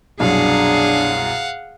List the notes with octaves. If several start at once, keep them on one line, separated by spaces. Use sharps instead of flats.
C2 F#2 B2 D4 G#4 F5 F#5